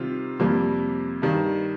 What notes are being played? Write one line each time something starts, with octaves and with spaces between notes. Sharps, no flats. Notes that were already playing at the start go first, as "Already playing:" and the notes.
Already playing: C3 D#3 G3 C4 F4
F2 C3 G3 A#3
G2 D#3 G3